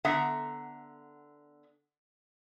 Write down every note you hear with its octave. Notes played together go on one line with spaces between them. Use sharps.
D3 B3 E5 F#5 A#5